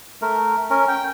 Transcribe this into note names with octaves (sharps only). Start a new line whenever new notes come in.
A3 A#4
C#4 A#4
G5